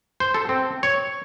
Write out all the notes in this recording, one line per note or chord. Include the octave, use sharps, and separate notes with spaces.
C5
A4
C4
C#5